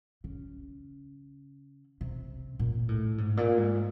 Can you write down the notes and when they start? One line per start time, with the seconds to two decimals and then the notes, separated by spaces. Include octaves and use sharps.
0.24 C#3
2.01 C3
2.59 A#2
2.89 A2
3.18 G#2
3.37 A#2
3.58 G#2